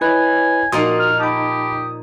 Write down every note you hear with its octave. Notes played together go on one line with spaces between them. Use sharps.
E4 B4 C#5 D#5 G#5
A#2 F3 D#4 F#4 C6 D#6
F6
G4 A5 B5 D#6